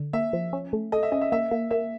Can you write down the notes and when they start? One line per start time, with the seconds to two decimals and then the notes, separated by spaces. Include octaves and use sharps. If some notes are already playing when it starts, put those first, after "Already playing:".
Already playing: D3
0.13 A#3 E5
0.33 F3
0.53 C#4
0.73 A3
0.92 A4 D#5
1.03 E5
1.12 C#4 D#5
1.21 E5
1.32 A#3 E5
1.51 A#3
1.71 A#3 E5